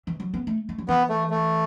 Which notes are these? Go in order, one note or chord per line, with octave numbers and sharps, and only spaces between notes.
E3
F#3
B3
A3
A3
F#3
E3 B3
A3
A3